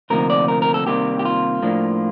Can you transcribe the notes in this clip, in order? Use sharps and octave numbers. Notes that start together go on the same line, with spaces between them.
D2 C3 F3 A#3 D#4 A#4
D5
A#4
A#4
A4
C3 D#3 G3 A#3 G4
G4
F4
A2 F3 A#3 D4